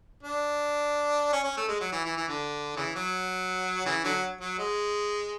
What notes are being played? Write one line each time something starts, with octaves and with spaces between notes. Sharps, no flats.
D4
C#4
C#4
A3
G#3
F#3
E3
E3
E3
D3
C#3 E3
F#3
C#3 E3
D3 F#3
F#3
G#3